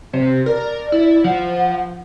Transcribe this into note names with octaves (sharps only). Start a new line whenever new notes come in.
C3 C4
A#4 D5
E4
F3 F#5